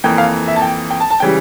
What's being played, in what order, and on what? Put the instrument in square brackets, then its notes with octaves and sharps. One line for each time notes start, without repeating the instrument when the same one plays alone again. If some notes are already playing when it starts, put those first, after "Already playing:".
[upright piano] F2 E3 A#3 G5
F5
E5
A5
G5
G5
A5
A5
C#3 E3 G3 G5